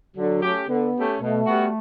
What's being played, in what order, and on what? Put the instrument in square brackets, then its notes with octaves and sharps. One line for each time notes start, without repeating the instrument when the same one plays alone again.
[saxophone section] D3 [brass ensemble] F#3
[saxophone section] A3 C#4 G4
[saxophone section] D3 [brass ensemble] B3
[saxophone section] A3 C#4 G4
[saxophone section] B2 [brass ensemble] A3
[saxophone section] G3 B3 F#4